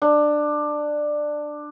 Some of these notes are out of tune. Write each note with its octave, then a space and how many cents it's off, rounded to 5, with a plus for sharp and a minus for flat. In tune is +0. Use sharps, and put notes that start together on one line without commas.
D4 +15